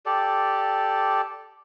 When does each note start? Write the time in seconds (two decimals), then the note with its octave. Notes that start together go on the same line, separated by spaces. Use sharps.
0.06 G4 A4 D5